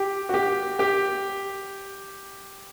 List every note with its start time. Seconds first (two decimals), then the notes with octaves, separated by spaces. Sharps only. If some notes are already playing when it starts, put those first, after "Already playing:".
Already playing: G4
0.29 F#4
0.34 G4
0.79 G4